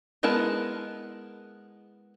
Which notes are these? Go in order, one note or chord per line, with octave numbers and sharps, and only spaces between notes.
G#3 B3 E4 A#4 A5